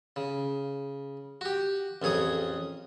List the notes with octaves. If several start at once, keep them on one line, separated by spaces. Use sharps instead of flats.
C#3
F#4 G4
A1 F2 G#4 C#5 D#6